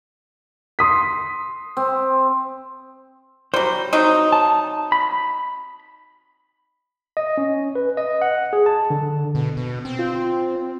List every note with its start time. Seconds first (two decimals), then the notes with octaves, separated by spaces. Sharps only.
0.79 C6 D#6 B6
1.77 C4
3.54 F#3 G3 C5
3.93 F#3 C4 D#4
4.33 A5
4.92 B5
7.17 D#5
7.38 C#4
7.75 B4
7.97 D#5
8.22 F#5
8.53 G#4
8.66 A5
8.90 D3
9.35 B2
9.57 B2
9.85 C4
9.99 F4